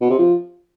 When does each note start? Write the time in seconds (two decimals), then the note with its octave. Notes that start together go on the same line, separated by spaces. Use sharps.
0.01 B2
0.10 C3
0.19 F3